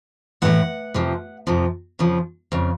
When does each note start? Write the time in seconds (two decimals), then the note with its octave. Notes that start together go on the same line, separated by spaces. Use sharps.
0.42 A2 E3 G#3 F#5
0.94 F2 C3 F3
1.47 F2 C3 F3
1.99 F2 C#3 F3
2.52 F2 C#3